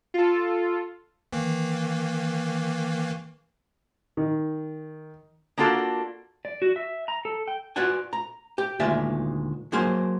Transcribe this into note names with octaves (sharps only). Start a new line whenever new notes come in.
F4 A4
D#3 E3 A#3
D#3
A#3 D4 F4 F#4 A4
D5
F#4
E5
A#5
A4
G5
F4 F#4 B4 D5 F#5 G#5
A#5
G4
D2 A#2 D#3 G#3 D5 E5
F#3 A#3 G#4 A#4 C5